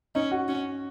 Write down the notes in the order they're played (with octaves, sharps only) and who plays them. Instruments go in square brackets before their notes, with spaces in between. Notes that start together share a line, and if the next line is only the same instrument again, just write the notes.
[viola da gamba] C#4 [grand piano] D#4
[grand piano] F#4
[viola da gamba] C#4